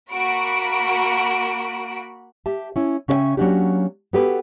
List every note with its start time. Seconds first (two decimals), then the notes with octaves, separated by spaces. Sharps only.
0.11 A#3 F#4 B5 D7
2.46 G4 E5 A5
2.76 C#4 E4
3.08 C#3 C#4 A#4 D5 E5 G5
3.37 F#3 A#3 C#4 D4 F#4 G4
4.13 B3 F#4 G4 A4 B4